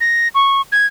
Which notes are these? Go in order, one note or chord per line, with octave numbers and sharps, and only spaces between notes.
A#6
C#6
G#6